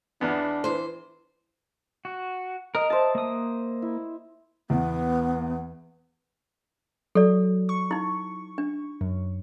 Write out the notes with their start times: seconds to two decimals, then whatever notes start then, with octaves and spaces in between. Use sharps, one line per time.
0.21 E2 B3 D4
0.64 E3 C5
2.05 F#4
2.75 A#4 D#5
2.90 C5 E5 A5
3.15 A#3 D#6
3.82 E4
4.70 E2 B3
7.15 F#3 A4 D5
7.69 C#6
7.91 D#4 E4
8.58 D4
9.01 F#2